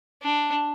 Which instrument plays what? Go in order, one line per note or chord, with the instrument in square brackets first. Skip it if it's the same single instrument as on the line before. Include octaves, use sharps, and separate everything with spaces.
[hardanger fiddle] D4